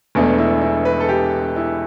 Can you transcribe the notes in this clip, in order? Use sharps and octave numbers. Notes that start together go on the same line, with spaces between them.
E1 E2 B2 A3 D4
E4
E4
B4
A4
G4
E4